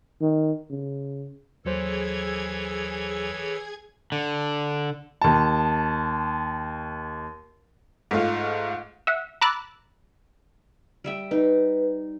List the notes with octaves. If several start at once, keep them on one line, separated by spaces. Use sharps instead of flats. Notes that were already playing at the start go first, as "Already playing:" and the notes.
D#3
C#3
D#2 E3 F#3 G#4 A4 C5 C#5 G#6
D3
D#2 A5
G#2 A3 F4
E5 F#5
A#5 B5 D6 E6 F#6 A6
G3 E5 G5
D#4 B4